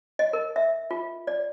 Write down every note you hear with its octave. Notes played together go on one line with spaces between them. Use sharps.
D#5
A#4
E5
F4
D5